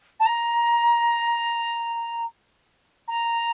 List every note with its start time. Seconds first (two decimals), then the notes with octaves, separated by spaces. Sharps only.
0.20 A5
0.26 A#5
3.08 A#5